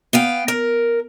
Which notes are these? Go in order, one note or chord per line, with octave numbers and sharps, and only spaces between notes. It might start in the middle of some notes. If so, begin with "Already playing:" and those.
B3 F5 G5
A#4